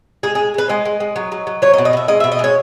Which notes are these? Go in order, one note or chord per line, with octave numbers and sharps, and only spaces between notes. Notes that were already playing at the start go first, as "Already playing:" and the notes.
G#3 G#4
G#3 G#4
G#3 B4
G#3 D#5
G#3
G#3
F#3
F#3
F#3
F#3 C#5
D#5
B2
D#5
B2 E5
G#3 D#5
B2 E5
D#5
G#3 C#5